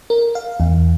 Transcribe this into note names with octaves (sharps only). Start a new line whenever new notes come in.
A#4
F5
E2